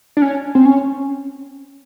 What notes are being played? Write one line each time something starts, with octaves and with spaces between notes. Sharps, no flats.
D4
C#4
C4
C#4